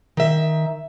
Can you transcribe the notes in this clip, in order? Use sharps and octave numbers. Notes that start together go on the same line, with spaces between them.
D#3 E5